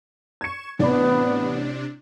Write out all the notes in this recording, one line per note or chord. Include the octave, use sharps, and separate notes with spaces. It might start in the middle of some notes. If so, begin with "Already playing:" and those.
C#6 G#6 C#7 E7
A1 C3 B3 D4 D5 B5